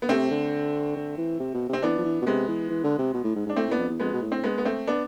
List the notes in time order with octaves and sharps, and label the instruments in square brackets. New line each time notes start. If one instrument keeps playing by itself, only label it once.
[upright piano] B3
[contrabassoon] C3 [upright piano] A3 C4
[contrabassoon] D3
D3
E3
C3
B2
[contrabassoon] C3 [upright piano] C4
[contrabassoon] E3 [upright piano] B3 D4
[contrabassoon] F3
E3
B2
[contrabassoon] C3 [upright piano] G#3 B3
[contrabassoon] E3
E3
D3
C3
B2
A2
G#2
[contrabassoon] G#2 [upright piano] D4
[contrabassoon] A2 [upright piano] A3 C4
[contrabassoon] A2 [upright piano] B3 D4
[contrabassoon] F2
E2
[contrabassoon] F2 [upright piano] G#3 B3
[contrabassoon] B2
A2
[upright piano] C4
G#3 B3
B3
A3 C4
B3 D4